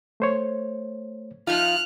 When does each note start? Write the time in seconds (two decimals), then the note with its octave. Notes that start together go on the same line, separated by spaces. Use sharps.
0.20 A3 C5 C#5
1.47 F3 D#4 F4 F6 F#6